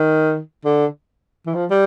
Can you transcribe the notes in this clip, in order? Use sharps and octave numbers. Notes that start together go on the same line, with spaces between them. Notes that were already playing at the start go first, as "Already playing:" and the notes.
Already playing: D#3
D3
E3
F3
G3